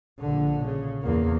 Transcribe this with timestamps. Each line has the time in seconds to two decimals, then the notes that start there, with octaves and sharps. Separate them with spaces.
0.19 A#1 D3
0.64 C#3
1.03 E2 A#3